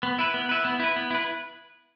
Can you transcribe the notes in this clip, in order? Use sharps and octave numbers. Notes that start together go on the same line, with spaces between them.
B3
E4 B4
B3
E4 B4
B3
E4 B4
B3
E4 B4